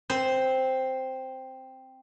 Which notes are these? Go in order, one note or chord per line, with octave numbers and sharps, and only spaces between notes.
C4 C5